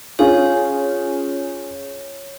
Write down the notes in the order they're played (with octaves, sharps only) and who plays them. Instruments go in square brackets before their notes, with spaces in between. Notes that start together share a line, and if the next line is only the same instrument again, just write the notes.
[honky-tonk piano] C#4 F4 G#4 [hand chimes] C#5